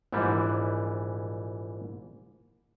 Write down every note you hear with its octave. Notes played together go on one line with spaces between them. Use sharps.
A#1 G#2 E3 G3